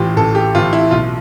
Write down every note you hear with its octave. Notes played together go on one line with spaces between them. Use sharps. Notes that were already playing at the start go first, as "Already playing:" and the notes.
Already playing: A1 A2 E3 F4 G4
A1 A4
G4
A2 E3 F4
E4
B1 F4